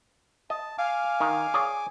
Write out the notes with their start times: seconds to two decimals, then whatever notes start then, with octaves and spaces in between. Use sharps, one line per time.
0.50 D#5 A5
0.78 F5 G#5 D6
1.20 D#3
1.54 G#4 C#5 D5